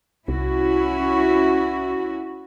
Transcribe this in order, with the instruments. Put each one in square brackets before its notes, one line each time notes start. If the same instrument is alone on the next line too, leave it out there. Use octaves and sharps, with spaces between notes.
[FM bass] C2 [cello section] C#4 E4 F#4